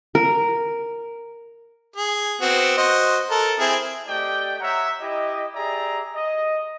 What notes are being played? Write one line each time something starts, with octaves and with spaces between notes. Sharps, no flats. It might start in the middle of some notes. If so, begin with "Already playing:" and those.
A#4
G#4
B3 C4 F#4
F#4 C5 D#5
A4 A#4
C4 E4 G#4
A3 G4 D5 D#5 G5
C#5 E5 F#5 A#5
E4 G4 D#5
G4 G#4 D5 E5 A#5
D#5